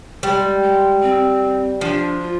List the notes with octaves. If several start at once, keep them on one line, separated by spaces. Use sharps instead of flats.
G3 G#3
G#3
C4
F3 D4
F4